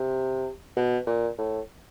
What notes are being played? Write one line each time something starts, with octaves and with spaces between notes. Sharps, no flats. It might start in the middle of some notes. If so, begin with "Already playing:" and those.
Already playing: C3
B2
A#2
A2